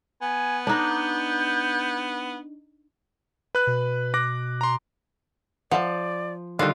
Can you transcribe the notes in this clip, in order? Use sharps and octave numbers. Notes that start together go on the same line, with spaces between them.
B3 G#5
D4 D#4 G6
B4 F#6
B2
D6 F#6 A#6
A#5 C6
F3 B4 D5 E5 F#5
D3 D#3 G3 D#4 F4 D#5 F#6